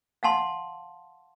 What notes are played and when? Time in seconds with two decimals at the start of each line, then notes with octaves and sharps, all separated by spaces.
0.23 F5 F#5 A5 C6